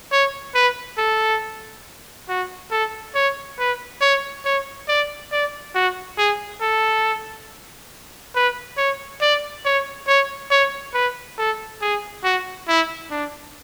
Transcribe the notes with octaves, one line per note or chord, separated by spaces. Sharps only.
C#5
B4
A4
F#4
A4
C#5
B4
C#5
C#5
D5
D5
F#4
G#4
A4
B4
C#5
D5
C#5
C#5
C#5
B4
A4
G#4
F#4
E4
D4